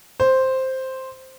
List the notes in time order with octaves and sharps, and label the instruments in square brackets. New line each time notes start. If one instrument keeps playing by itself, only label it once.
[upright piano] C5